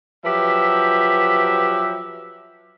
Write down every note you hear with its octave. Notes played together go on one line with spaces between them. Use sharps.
F3 F#3 G4 B4 E5